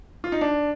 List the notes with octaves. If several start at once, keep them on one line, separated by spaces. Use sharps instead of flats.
F4
D#4
D4